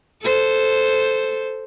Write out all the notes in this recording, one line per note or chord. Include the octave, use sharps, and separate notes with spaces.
A4 C5